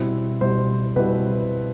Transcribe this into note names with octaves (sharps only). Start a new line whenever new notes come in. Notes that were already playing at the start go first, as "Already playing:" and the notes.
Already playing: B2 G3 C4 E4
B2 G3 C4 E4 C5
B2 G3 C4 E4 B4